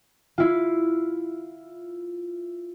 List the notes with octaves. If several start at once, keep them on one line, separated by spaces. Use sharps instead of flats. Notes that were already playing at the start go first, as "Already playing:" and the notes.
E4 F4